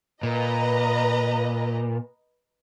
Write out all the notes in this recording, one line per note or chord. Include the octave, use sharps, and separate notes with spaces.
A#2 B4 D#5 A#5